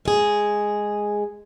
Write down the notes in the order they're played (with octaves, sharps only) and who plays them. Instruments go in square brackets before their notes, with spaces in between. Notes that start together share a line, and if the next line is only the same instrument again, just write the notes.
[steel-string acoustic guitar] G#3 G#4